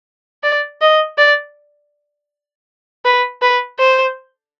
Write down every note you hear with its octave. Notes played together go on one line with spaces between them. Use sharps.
D5
D#5
D5
B4
B4
C5